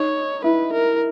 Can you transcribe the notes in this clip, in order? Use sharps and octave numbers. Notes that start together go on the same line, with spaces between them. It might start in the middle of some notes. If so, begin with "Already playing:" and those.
Already playing: D#4 C#5
E4 B4
A#4